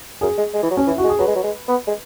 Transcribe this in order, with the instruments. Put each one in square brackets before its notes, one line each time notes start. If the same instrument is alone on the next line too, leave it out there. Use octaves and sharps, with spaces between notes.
[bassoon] F#2 [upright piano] G#4
[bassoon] G#3
G#3
E3
F#3
[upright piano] C#4
[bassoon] E3 [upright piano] E4
[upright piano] F#4
[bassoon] G#3
[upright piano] G#4
[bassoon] F#3 [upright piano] B4
[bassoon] G#3
F#3
G#3
B3
G#3